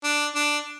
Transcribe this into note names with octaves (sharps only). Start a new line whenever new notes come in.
D4
D4